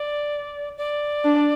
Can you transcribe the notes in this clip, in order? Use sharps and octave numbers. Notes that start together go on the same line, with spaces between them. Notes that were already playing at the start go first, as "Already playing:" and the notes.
Already playing: D5
D5
D4